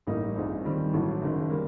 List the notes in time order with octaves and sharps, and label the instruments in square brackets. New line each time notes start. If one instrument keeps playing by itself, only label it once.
[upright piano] A1 A2 G3 A#3 D#4
A#1 A#2 G3 C4 D#4
D#2 D#3 G3 C4
A1 A2 F#3 A3
F#1 F#2 D#3
G3 A#3